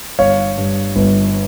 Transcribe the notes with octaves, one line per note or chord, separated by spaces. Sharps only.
G1 C#5 F5
G2
G1